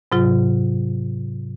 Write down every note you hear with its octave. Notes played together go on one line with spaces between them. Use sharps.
G#2 C3 F#3 F4